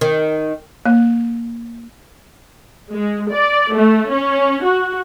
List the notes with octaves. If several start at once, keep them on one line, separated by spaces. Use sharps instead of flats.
D#3
A#3
G#3
D5
A3
C#4
F#4